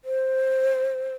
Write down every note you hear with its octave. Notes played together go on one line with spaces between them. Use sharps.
C5